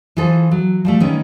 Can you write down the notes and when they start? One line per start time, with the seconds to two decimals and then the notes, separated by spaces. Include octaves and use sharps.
0.17 E3 F4 G#4 A4 C5
0.51 F#3
0.85 F3 G3 A3
1.00 D#3 B3 C#4